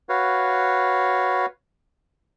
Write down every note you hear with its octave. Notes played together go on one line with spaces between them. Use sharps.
F#4 B4 C#5 F5